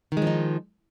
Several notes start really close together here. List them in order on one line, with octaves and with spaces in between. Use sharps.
D#3 G#3 F3 D#4